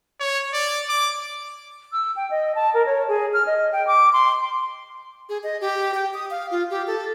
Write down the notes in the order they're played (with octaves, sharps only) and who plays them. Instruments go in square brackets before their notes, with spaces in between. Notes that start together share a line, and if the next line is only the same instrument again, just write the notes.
[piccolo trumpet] C#5
D5
D6
[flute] E6
G5
D#5
A5
A#4
C#5
G#4
F6
D#5
G5
D6
C6
[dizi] G#4
D#5
G4
G5
D#6
F5
F4
G4
A4